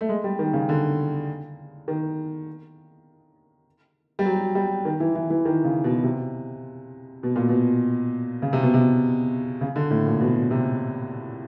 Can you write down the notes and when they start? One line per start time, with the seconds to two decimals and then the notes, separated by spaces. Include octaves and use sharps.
0.01 A3
0.09 G#3
0.24 G3
0.39 D#3
0.53 C#3
0.69 D3
1.88 D#3
4.19 G3
4.26 F#3
4.55 G3
4.85 D#3
5.00 E3
5.15 E3
5.30 E3
5.45 D#3
5.64 C#3
5.84 B2
6.04 C3
7.23 B2
7.36 A#2
7.49 B2
8.42 C#3
8.53 C3
8.63 B2
8.74 C3
9.61 C#3
9.76 D3
9.91 A2
10.06 A#2
10.21 B2
10.51 C3